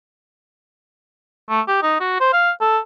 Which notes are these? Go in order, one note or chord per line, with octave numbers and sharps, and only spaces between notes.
A3
G4
D#4
F#4
C5
F5
A4